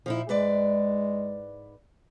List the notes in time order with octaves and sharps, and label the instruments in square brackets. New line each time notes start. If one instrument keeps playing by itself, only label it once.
[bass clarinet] A#2 [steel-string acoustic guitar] F3 D#4 E4
[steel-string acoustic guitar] G#2 B4 D5 [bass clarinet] G#3